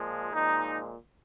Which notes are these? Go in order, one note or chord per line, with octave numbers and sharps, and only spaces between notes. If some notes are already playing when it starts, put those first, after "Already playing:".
Already playing: A#2 F3 G#3
A#2 F3 G#3 D#4